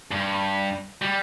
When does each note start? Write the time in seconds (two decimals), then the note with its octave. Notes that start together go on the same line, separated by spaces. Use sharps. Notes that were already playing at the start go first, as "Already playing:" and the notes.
0.11 G2
1.02 G3